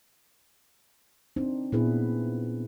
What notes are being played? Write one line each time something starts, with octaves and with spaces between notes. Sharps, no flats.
C4 D4 D#4 C5
A#2 B3 D4 E4 G#4 B4